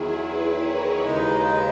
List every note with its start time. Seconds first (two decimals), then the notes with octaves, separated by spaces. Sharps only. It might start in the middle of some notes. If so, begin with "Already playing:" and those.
Already playing: E2 D#3 F#3 E4 G#4
0.25 G#4 B4
0.64 A#4 C#5
1.03 D#2 C#3 G#3 D#4 B4 D#5